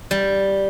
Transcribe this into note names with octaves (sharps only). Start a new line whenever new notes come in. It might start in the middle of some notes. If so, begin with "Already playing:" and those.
G3